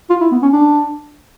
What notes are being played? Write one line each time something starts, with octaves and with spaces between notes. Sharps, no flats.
F4
E4
B3
C#4
D4